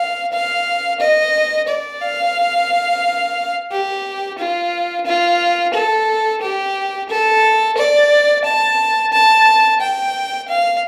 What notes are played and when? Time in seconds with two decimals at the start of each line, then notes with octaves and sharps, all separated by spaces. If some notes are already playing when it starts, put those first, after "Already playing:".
Already playing: F5
0.33 F5
1.00 D#5
1.68 D5
2.02 F5
3.71 G4
4.39 F4
5.06 F4
5.74 A4
6.42 G4
7.10 A4
7.77 D5
8.45 A5
9.13 A5
9.81 G5
10.48 F5